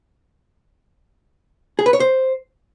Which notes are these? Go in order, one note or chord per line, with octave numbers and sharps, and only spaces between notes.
G#4
B4
C#5
C5